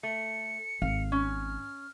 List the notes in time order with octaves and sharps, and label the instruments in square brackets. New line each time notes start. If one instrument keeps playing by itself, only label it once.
[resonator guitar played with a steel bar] A3 [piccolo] C#7
[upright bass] G#1 [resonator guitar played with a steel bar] F5
[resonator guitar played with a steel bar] C#4 [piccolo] F6